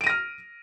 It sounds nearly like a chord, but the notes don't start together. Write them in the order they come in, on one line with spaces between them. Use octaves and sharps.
D7 D#7 A#6 F6